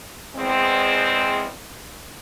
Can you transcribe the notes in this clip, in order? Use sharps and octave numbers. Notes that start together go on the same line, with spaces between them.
E2 G#3 C4